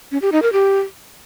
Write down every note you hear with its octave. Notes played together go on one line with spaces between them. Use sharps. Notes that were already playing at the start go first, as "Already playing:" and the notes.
C#4
G4
D#4
A#4
G4